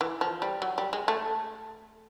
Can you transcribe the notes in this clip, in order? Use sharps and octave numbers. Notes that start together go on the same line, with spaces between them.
E3
F3
G3
F#3
G3
G#3
A3